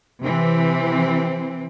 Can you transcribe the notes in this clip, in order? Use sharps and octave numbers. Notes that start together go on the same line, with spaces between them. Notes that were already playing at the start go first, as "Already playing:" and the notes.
C3 E3 C4